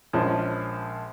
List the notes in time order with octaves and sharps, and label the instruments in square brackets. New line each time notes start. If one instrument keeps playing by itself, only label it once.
[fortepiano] A#1 F3 G#3 C#4 A5